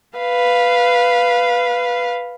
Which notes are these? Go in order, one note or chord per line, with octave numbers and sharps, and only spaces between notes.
B4 F5